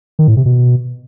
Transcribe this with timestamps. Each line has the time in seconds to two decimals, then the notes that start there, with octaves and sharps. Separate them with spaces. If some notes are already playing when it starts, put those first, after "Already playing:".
0.19 D#3
0.28 A2
0.37 C3
0.46 B2